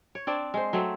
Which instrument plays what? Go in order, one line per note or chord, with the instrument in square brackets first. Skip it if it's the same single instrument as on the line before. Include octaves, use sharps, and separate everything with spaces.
[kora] C#5
C4 D4 D5
G#3 C5
F#3 A3 C4